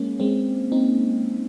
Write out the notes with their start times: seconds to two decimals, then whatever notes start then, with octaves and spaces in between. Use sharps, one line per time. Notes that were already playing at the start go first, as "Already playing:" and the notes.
Already playing: G#3 A#3 C#4
0.20 G#3 C4
0.72 C4 D#4